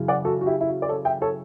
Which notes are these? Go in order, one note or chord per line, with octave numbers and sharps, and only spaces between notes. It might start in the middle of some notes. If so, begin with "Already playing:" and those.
Already playing: F#2 C#3 E3
D5 F#5
F#4 A4
F#4
E4 G4
E4
F#4
D5
A4 C#5
E5 G5
A4 C#5